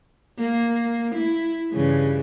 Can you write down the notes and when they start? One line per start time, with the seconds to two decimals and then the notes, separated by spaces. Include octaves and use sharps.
0.38 A#3
1.15 E4
1.71 G2 C#3 E3